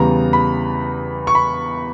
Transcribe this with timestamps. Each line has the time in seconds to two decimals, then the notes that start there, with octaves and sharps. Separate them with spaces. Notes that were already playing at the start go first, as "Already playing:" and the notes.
Already playing: E2 C#3 E3 G3 A#5
0.33 B5
1.27 C#6
1.35 B5